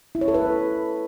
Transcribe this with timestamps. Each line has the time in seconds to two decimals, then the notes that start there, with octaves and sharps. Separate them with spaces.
0.15 E4
0.21 C#5
0.28 A4
0.34 B4